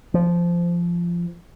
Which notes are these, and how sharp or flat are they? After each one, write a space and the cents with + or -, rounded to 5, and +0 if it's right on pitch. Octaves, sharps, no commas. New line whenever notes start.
F3 -15